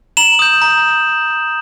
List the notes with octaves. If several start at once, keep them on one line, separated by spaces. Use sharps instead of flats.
A#5 E7 F#7
D#6 G6
A#5